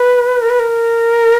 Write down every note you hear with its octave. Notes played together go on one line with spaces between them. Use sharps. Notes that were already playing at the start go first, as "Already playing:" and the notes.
Already playing: B4
A#4
B4
A#4